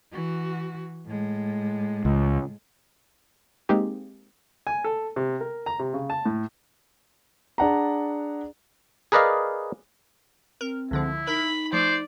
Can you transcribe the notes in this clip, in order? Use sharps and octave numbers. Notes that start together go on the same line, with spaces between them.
E3 F#4
A2 G#3
C#2
G#3 A#3 C4 D#4 G4 G#4
G#5
A4
C3
A#4
A#5
C3
C#3
A5
A2
D4 G#4 F#5 A5 A#5
G#4 A#4 B4 D5 D#5 F5
C4 A#4
C#2 D3 F3 E4
D#4 A#4 B5
F3 A3 C5 D5